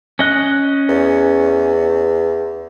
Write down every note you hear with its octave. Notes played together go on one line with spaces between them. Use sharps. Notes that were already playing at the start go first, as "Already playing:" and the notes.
C#4 D#5 F#6
E2